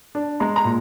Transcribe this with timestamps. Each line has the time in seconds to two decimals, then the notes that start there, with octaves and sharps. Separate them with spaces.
0.15 D4
0.40 G#3 A#5
0.56 A#5
0.65 A#2